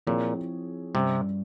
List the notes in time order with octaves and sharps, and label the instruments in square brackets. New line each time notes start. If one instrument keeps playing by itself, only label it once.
[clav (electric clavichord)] A#2 [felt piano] F3 C4 E4 G#4 C#5
[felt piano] G2 G3 C#4 [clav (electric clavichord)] C3